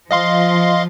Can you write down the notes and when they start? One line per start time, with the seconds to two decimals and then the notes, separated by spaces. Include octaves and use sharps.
0.11 F3 D#5 F5 C6